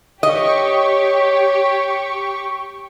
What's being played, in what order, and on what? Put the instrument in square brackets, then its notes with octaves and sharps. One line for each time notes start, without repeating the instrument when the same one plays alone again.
[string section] G4 [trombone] C#5 [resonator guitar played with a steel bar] D#5 [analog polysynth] C#6